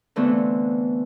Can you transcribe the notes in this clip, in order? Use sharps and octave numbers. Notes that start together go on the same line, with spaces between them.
D3 E3 A3 B3 C4 F4